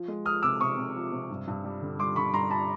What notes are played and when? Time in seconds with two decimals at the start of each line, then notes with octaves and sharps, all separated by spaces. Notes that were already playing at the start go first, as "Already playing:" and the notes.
Already playing: F3
0.08 G#3
0.25 F3 D#6 F6
0.42 C3 D6 E6
0.60 C3 C#6 D#6
0.77 C3
0.95 F3
1.12 C3
1.30 G2
1.47 G2
1.64 G3
1.82 D3
1.99 G3 C6 D6
2.16 D3 B5 C#6
2.33 G2 A#5 C6
2.51 A5 B5